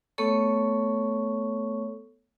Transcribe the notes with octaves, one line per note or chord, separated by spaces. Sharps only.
A3 B3 A4 C#5 C#6